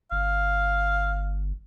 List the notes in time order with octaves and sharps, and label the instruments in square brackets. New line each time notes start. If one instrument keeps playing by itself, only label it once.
[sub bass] G1 [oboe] F5